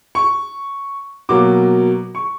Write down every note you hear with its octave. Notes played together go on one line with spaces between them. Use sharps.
C#6
B2 F#3 A#3 D6
C#6